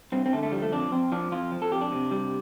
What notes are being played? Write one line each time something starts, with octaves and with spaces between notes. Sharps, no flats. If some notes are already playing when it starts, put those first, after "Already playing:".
G2 C4
C4
D3 A3
A3
F3 G3
A3
F2 D4
F2 C4
F3 D4
F2 F4
F3
A4
F2 G4
D4
C3
G3